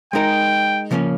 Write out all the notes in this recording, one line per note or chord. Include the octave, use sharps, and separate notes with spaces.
G#3 D#4 A#4 G5
C#3 F3 A#3 C#4